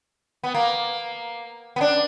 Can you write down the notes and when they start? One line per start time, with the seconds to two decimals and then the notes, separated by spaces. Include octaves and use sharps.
0.43 B3
0.54 A#3
1.76 B3
1.81 D4